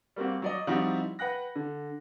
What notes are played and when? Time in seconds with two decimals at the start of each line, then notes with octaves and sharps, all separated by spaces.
0.16 G3 A#3 C4 F#4
0.42 F#3 D5 D#5
0.67 F3 G3 C4 D#4 E4 F#4
1.19 B4 F#5 G5 F#6 A#6
1.56 D3